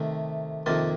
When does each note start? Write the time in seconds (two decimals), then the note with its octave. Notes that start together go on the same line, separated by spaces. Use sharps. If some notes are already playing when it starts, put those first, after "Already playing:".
Already playing: C3 D#3 A3
0.66 F2 C3 D#3 A#3 A5 C6